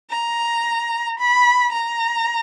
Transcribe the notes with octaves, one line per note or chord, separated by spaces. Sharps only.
A#5
B5
A#5